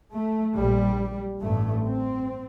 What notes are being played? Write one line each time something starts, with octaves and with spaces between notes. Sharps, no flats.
A3
A#1 A#2 G3
A1 G2 A3
C4